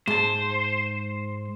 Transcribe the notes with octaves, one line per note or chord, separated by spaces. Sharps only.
G#2 C5 A5